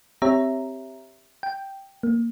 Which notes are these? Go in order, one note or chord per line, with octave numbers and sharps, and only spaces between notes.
C4 G4 C#5 E5 A#5
G5
A#3